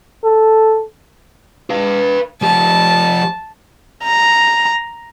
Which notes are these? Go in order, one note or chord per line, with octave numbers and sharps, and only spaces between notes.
A4
B4 F5
F3 G4 A5
A#5